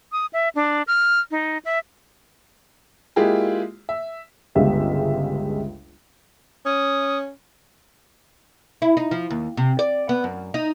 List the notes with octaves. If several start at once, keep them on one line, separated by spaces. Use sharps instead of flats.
D#6
E5
D4
F6
D#4
E5
G#3 A#3 E4 F4 G4 G#4
E5
G1 C#2 G#3 G4 E5 F5
C#4 D#6
E4
D#4
F3
D#2
C3
D5
B3
F#2
D#4